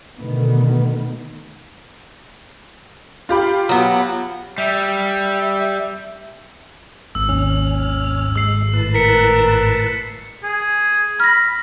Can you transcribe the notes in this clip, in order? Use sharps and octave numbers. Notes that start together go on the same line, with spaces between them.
B2 D3 D#3 A3 B3
F4 G4 B5
F#3 B3
G3 E5
G#1 E6
D#2 C#4 F6
G#3 E6 C7
A2 B4 A5
A#4 B6 C#7
G#4
B5 F6 A#6